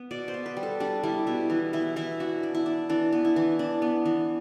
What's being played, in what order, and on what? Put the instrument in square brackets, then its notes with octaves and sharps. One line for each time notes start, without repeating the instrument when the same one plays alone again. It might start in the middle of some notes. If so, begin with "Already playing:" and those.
Already playing: [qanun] B3
B2 D5
C5
B3
B4
G3
A4
G3 D4
G3 E4
B2 E4
E3 E4
E3 E4
E3 E4
D4 F#4
D4
E4
D4
E3 D4
B3
E4
E3
D4
B3
E3